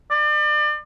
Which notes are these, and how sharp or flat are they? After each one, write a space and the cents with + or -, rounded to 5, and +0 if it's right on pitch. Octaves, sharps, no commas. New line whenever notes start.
D5 +35